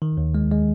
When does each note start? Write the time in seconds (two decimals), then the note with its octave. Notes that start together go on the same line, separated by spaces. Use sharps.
0.02 D#3
0.17 D#2
0.35 G#3
0.51 G#3